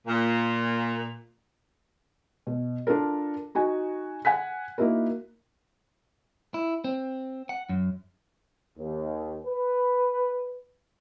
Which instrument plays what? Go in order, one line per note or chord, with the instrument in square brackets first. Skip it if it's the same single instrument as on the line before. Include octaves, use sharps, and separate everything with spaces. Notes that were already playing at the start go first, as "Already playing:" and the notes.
[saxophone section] A#2
[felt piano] B2
D4 F4 A4 A#4
D#4 F#4 G#5
F#5 G#5 F#6 B6
A#3 D#4 E4 F#4 A#4
[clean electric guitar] E4
C4
F#5
F#2
[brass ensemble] D#2
B4